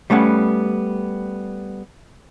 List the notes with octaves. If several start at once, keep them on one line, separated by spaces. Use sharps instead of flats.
G3 A3 B3 C#4 F#5